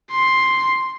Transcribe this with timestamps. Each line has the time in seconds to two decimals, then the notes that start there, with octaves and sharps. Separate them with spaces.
0.11 C6